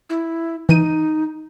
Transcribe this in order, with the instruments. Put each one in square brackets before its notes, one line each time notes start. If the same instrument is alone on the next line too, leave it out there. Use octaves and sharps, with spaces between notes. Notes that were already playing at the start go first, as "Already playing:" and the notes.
[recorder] E4
[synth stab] E3 D#7 [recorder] D#4